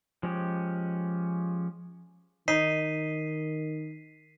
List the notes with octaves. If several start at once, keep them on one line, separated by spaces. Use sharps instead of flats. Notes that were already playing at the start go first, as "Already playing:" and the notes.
F3 G#3 C#4 G4
D#3 D#4 B6 C7 D#7